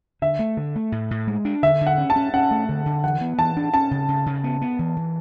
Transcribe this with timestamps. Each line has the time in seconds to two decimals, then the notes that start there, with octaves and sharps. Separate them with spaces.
0.22 D3 E5
0.39 A3
0.57 D3
0.76 A3
0.92 A2
1.11 A2
1.27 G#3
1.45 D4
1.63 D3 E5
1.81 D3
1.87 F#5
1.98 C#4
2.10 A5
2.16 C#4
2.33 C#4 F#5
2.51 A3
2.69 D3
2.86 D3
3.04 E3 F#5
3.21 B3
3.38 E3 A5
3.57 D4
3.74 C#4 A5
3.91 C#3
4.08 C#3
4.26 C#3
4.44 B3
4.62 B3
4.79 E3
4.97 E3